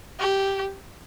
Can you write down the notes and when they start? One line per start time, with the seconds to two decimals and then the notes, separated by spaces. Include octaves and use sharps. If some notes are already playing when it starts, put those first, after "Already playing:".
0.20 G4